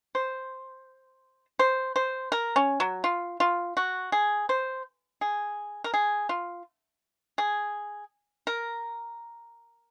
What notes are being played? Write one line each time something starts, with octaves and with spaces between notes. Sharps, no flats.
C5
C5
C5
A#4
C#4
F#3
F4
F4
F#4
G#4
C5
G#4
A#4
G#4
F4
G#4
A#4